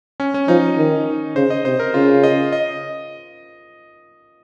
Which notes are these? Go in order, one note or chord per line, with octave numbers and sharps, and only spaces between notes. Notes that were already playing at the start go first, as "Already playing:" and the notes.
C#4
C#4
F3 D#4
D#3
C#3 C5
D#5
C3 C5
A#4
C#3 F4
D#5
D#5